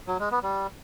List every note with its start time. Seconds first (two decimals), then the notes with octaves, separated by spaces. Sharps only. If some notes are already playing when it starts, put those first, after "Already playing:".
0.08 F#3
0.19 G#3
0.31 B3
0.43 G3